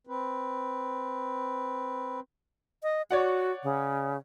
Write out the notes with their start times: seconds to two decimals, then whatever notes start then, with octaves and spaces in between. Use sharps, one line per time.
0.07 C4 B4
2.83 D#5
3.11 F#4 C#5 D5 F#5
3.63 C#3